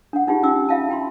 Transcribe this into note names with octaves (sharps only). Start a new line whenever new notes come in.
D4 F#5
D4 D#4 F4 G4 G#4
C#4 D#4 F4 G5 D6 E6
F4 E5 F5 G5 A5
E4 G5 B5 C6